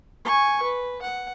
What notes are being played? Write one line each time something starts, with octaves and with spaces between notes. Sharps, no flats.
G#5 C#6
B4
F#5